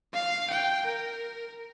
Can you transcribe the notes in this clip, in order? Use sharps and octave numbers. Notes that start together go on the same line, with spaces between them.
F5
G5
A#4